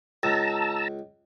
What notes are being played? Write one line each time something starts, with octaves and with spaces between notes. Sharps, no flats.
C#2 A5 A#5 E6